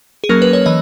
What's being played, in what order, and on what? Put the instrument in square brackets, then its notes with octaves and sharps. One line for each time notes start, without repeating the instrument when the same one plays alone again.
[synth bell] G#4
F#3 A#3 C#4 A#4
B4
C#5
E3 D#5